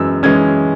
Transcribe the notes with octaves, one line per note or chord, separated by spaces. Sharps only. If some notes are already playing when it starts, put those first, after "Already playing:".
Already playing: F#2 E3 G#3 C#4 E6
E3 G#3 C#4 G#6